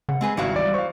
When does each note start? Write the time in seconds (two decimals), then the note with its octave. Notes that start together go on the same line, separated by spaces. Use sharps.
0.09 C#3 F#5
0.21 G#3 C4 G#4 B4
0.37 G#1 F#3 G3 E4 F#4 F5
0.56 E2 D5
0.74 C5 F5 C#6